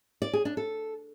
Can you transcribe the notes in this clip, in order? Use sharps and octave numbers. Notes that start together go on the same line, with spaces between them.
D5
G#4
D4
A4